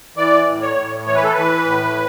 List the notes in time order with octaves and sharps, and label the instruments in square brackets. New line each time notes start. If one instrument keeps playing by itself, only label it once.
[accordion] E3 D5
A2
C#5
A2
E3 C#5
B4
A4
E3 B4
A2